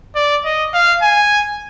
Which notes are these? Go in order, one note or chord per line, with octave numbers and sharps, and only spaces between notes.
D5
D#5
F5
G#5